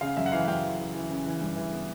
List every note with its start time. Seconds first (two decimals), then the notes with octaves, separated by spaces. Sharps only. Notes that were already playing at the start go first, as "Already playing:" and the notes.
0.01 C#3 F5
0.17 F#2 E5
0.26 F#5
0.32 E3 F5
0.48 F#2 F5 G5
0.64 E3
0.79 E3
0.95 E3
1.10 C#3
1.26 E3
1.41 G2
1.56 E3
1.73 B3